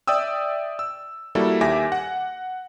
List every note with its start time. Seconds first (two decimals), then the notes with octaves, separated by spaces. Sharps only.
0.07 D5 E5 G5 D#6 E6
0.79 E6
1.35 G3 A#3 E4 F#4 A4
1.61 D#2 G4 E5 G#5 D6 A#6
1.92 F#5